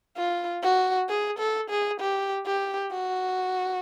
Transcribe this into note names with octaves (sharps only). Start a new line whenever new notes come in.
F4
F#4
G#4
A4
G#4
G4
G4
F#4